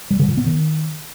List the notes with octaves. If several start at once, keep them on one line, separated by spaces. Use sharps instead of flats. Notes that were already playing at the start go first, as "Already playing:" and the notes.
G3
D3
A#2
B3
D#3